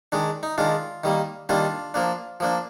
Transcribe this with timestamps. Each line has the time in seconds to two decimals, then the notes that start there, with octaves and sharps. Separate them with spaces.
0.12 D#3 G#3 D4
0.43 D#4
0.58 D#3 G#3 D4 F4
1.04 D#3 G3 A#3
1.49 D#3 G3 A#3 D4 F4
1.94 F3 A#3 D4
2.40 F3 A#3 D4